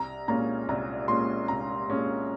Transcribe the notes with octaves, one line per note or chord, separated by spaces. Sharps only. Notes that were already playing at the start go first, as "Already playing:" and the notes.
Already playing: C2 A#5
A#2 G#3 C#4 F4 A#5
C2 A#5
A#2 G#3 C#4 F4 C6
C2 A#5
A#2 G#3 C#4 F4